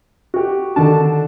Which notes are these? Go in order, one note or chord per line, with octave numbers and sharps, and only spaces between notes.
F#4 G4
D3 D#3 D4 A5